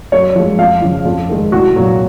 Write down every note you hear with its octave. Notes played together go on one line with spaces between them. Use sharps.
F#2 C#5
F3 G#3
F2 F5
C#3 F3
F2
D#3 G#3
C2 F#4
A#2 F#3